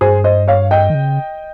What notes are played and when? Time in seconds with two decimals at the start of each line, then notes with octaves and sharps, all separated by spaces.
0.01 G2 G#4 C5
0.24 C5 D#5
0.48 C#5 F5
0.71 D#5 G5
0.90 D#3
0.95 C#3